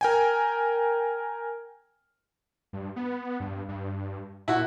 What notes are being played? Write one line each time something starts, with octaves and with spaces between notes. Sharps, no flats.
A#4 G5 G#5
G2
B3
G2
G2
A#2 E4 F#4